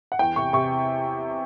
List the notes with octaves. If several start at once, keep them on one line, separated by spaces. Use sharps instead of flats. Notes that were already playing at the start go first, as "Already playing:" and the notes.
F#5
E2 G5
C3 C#6
C3 C#6